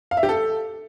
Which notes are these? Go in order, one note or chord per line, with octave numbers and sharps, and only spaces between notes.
F5
E5
G4
A4